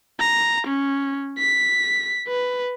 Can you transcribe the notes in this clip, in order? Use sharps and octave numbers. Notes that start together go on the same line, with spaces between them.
A#5
C#4
B6
B4